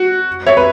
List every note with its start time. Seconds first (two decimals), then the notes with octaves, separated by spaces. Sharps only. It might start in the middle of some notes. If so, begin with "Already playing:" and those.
Already playing: F#4
0.47 C#5 E5
0.57 B4